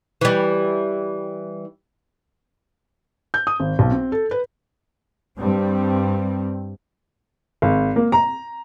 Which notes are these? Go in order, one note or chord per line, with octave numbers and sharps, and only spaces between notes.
E3 G3
G6
D#6
G#1
B1
C4
A4
B4
G2 G3 C4
G#1
A#3
A#5